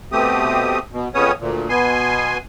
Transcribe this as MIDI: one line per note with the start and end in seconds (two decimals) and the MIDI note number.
0.12 0.79 47
0.12 0.79 57
0.12 0.79 60
0.12 0.79 67
0.12 0.79 87
0.93 1.09 47
1.14 1.32 41
1.14 1.32 49
1.14 1.32 59
1.14 1.32 61
1.14 1.32 73
1.14 1.32 87
1.40 1.68 38
1.40 1.68 46
1.69 2.38 47
1.69 2.38 59
1.69 2.38 80
1.69 2.38 84